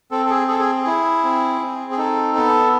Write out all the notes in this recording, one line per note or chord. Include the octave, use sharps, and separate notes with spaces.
C4 A4
A4
G#4
G#4 A4
G#4
E4 G#4
C4
C4
G#4
D#4 A4
B3 A4